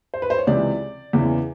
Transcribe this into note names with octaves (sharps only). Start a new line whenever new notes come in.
C5
B4
C5
C#5
C#2 C3 E3 G#3 D5
E2 C#3 E3